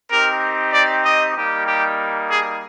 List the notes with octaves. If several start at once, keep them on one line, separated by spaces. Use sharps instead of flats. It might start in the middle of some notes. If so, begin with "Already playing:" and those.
C4 D#4 G4 A#4
D5
D#5
G3 A#3 D#4 G4
G4
G#4